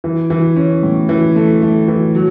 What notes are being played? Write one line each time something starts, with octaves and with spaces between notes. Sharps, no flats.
E3
E3
C#4
A2
E3
A3
A3
E3
F#3